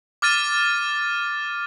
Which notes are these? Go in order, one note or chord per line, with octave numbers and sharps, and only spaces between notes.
D6 F6 A6 D#7